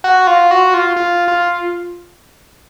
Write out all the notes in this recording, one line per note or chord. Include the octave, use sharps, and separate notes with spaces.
F#4
F4
F#4
F4
F4
F4